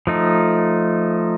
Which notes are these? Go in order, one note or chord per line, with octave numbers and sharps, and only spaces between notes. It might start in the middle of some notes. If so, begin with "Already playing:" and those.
F3 A3 D#4